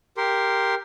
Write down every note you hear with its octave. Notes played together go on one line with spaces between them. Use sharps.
G4 A#4 C6